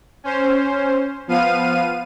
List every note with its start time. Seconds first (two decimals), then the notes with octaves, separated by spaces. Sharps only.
0.24 C#4 C5
1.28 F3 B3 F5 D#7